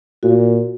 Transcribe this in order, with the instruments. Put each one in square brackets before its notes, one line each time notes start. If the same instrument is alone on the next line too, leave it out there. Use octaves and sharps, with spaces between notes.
[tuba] A#2 [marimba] F#4